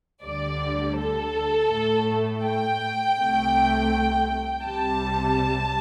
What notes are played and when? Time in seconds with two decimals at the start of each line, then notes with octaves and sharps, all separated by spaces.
0.22 D2 D3 G3 D5
0.97 A4
1.70 A2 A3
2.43 G5
3.17 C2 C3 A3
4.64 C2 C3 G3 A5